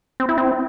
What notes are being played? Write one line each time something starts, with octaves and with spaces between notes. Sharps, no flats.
C4
E4
C4